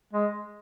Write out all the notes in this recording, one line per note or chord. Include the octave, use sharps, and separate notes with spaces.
G#3